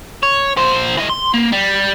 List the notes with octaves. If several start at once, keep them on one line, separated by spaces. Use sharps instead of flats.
C#5
A#2 C5
E3 D#5
C6
A#3
G3